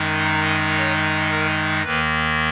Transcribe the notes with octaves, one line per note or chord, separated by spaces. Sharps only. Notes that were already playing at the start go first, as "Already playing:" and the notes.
Already playing: F#2 D#3 G#3 D#4
A#5
C#5
A#4
D#2 D#3 A#3 B4